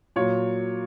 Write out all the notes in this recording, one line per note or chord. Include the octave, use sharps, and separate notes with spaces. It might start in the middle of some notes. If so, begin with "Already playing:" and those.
A#2 F#3 C#5